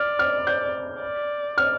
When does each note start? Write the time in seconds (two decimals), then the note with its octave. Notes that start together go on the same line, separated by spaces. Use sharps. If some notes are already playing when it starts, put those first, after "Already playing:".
Already playing: D5 F6
0.19 F6
0.47 G6
1.02 D5
1.58 F6